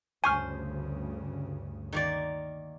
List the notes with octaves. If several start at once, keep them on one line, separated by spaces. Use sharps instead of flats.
D2 G2 C#3 C5 G#5 C#6 F6
D#3 A#3 D5